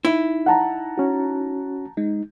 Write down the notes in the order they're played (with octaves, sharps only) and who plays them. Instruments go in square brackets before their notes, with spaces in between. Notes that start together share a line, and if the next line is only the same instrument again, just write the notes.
[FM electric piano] D#4 [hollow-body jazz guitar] E4
[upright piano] F#5 A5 A#5
[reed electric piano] C#4 F#4
[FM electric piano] G#3 [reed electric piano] D#4